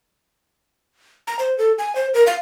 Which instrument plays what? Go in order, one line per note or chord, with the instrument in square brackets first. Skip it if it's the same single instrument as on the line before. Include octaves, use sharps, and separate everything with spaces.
[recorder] A#5
C5
A4
G#5
C5
A#4
F5